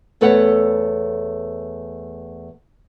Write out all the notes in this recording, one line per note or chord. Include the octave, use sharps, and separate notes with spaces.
E2 A3 A4 B4 C#5 F#5